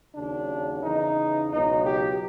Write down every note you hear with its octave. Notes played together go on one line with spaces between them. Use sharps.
D#2 C#3 F#3 D4
E2 C#3 E3 D#4
C#2 B2 F#3 D#4
G4